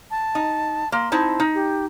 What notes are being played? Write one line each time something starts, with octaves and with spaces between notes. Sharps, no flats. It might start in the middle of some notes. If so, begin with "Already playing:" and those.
A5
D#4
A#3 C6
C4 D#4 E4 A5
D#4
G4